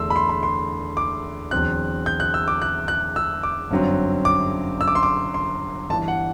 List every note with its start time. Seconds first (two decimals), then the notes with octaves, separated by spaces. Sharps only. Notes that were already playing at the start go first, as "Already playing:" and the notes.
Already playing: E2 D3 A3 D4 C6 E6
0.10 B5
0.16 C6
0.29 B5
0.43 C6
0.97 D6
1.51 E2 D3 F#3 C4 F#6
2.06 G6
2.20 F#6
2.34 E6
2.48 D6
2.62 F#6
2.88 F#6
3.16 E6
3.43 D6
3.71 G1 F#2 D3 F#3 C4
4.25 D6
4.81 E6
4.88 D6
4.95 C6
5.03 D6
5.34 C6
5.90 G1 G2 E3 A5
6.08 F#5